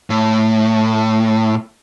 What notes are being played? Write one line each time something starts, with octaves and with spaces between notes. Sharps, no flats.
A2